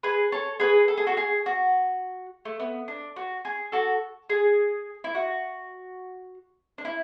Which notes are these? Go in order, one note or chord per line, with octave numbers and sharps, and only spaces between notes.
G#4 B4
A4 C#5
G#4 B4
A4
G#4
F#4 A4
G#4
F#4
A3
B3
D4
F#4
G#4
F#4 A4
G#4
E4
F#4
D4
E4